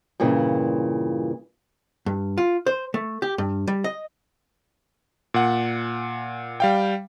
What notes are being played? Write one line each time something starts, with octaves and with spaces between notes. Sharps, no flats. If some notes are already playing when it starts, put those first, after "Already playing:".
G2 A#2 C#3 E3
G2
F4
C5
A3
G4
G2
G3
D#5
A#2 F#5
G3 F5 G5